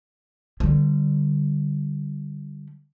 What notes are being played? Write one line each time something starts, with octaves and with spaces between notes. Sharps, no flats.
D3 G3